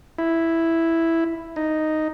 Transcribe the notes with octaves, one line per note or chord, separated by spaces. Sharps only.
E4
D#4